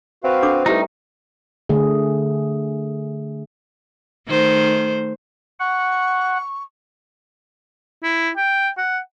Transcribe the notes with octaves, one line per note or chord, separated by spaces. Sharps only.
C4 F#4 B4 F5
D4 A4 D6
G3 A3 D#4 E4 G4 B4
D3 A3 G#4
D#3 A3 C5
F#5 C#6
E4
G5
F#5